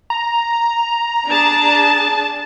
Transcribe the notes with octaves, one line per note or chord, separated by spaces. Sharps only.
A#5
D4 G#4 A5